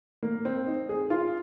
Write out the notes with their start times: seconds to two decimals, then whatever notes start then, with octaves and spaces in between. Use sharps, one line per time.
0.23 A#3
0.45 C4
0.67 D#4
0.89 G#4
1.10 F4